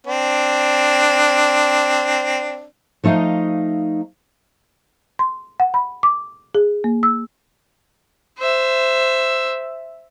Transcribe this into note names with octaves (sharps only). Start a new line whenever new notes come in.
C4 D4
F3 A3 D#4 D#5 F5
C6
F#5
B5
D6
G#4
A#3
E6
C5 E5